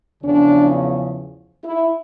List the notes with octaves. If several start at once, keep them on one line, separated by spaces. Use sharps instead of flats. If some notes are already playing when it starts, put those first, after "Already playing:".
E2 C#3 F3 C#4 D4
E4